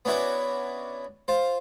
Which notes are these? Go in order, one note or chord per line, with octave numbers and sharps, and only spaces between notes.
B3 C#4 D4 E4 F#4 B4
F4 C5